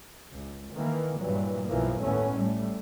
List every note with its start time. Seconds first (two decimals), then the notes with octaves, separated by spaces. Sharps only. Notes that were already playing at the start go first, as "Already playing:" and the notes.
0.31 C#2
0.73 D#3 E3 A#3
1.18 G2 A#2 E3 F#3
1.67 B1 A#2 E3 F3 A#3
2.02 A1 D#2 A3 B3 C#4
2.33 A2 G3 A3